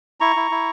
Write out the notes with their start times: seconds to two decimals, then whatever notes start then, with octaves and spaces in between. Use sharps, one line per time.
0.20 E4 A#5 C#6
0.36 E4
0.51 E4